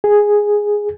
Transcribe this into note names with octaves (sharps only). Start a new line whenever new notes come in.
G#4